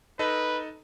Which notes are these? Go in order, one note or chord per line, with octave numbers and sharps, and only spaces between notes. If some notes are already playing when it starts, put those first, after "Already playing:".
D#4 A4 B4 D#5